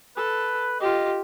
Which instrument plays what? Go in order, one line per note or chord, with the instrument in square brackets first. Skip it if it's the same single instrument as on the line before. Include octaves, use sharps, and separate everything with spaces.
[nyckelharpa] A4 [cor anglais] B4
[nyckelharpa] F4 G4 [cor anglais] D#5